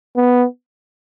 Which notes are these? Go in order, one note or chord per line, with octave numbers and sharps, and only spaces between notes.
B3